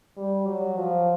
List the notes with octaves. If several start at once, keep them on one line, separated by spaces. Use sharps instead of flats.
G3
F#3
F3